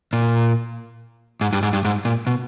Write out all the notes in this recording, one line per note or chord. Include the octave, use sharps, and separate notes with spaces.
A#2
G#2
G2
G#2
G2
G#2
A#2
B2